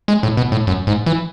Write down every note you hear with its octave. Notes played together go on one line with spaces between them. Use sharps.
G#3
A2
B2
A2
F#2
G#2
E3